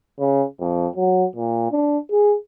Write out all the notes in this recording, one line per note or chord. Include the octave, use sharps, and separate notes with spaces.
C#3
F2
F#3
A#2
D4
G#4